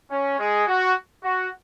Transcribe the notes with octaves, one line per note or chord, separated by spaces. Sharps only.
C#4
G#3 G#4
F#4
F#4